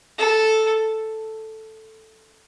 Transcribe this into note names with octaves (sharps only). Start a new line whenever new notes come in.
A4